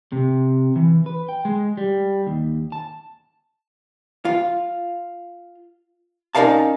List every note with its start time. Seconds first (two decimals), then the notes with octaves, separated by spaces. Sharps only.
0.12 C3
0.76 E3
1.06 B4
1.29 G5
1.45 G#3
1.77 G3
2.27 D#2
2.72 A5
4.25 F4
6.35 C#4 D#4 A#4 D5 F5 A5